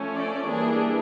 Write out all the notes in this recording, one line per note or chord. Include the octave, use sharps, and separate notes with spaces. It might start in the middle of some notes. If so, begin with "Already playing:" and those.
Already playing: F3 A3 C#4
D5
E3 G3 A#3 D4 G#4